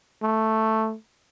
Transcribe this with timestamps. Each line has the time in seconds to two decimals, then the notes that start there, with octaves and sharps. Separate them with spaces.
0.23 A3